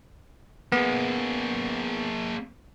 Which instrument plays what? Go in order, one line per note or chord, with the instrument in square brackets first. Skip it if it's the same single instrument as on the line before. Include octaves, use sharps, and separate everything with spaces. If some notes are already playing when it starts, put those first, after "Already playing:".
[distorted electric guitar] A#3 G#4 [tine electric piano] B3